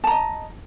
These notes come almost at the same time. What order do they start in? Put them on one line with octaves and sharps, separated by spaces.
A5 A#5 D#5